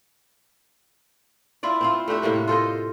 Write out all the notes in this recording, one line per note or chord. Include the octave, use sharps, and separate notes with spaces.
E4 F4 D5
C4 E4 F4
A3 D4 G4 E5
A2 C3 A#3 F#4
F4 A4 C5 D#5